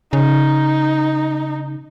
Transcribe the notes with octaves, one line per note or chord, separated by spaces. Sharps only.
C#3 D#4